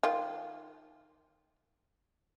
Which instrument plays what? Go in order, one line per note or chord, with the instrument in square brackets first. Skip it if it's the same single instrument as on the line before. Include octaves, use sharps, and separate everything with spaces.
[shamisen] D#3 F4